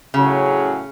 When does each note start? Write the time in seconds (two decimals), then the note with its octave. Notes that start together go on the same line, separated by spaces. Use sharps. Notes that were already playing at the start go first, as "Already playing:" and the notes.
0.14 A2 C#3 F#3 C#4 G#4